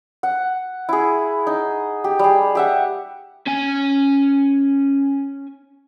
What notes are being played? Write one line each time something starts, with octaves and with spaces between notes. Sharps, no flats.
F#5
E4 G#4
D#4
G4
G3 G#4
G4 E5 F#5
C#4 G#5